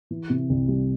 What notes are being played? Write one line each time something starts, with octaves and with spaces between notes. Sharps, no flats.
E3
C3
C2
G3